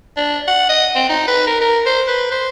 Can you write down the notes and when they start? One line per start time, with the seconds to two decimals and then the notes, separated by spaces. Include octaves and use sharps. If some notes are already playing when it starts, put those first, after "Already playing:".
0.17 D4
0.47 F#5
0.69 D#5
0.95 C4
1.09 D#4
1.28 B4
1.47 A#4
1.61 A#4
1.86 C5
2.08 B4
2.32 C5